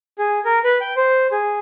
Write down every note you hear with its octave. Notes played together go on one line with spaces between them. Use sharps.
G#4
A#4
B4
G5
C5
G#4